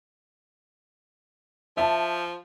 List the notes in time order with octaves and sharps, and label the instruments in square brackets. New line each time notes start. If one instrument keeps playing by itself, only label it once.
[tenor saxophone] F3 [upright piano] E5 A5